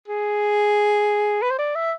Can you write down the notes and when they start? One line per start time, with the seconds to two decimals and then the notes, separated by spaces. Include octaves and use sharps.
0.08 G#4
1.42 B4
1.50 C5
1.59 D5
1.75 E5